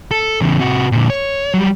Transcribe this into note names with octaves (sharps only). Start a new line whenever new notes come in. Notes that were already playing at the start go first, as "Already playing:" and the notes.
A4
E2 C#3
C3 F#4
A#2 D3
C#5
F#3 G3